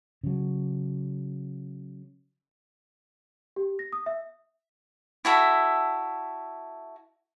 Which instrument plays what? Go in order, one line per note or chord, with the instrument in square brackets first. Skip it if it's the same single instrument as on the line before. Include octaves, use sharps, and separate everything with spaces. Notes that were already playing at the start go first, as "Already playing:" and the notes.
[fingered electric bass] C#3 F#3
[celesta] G4
A#6
D#6
E5
[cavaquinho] E4 F#4 A4 E5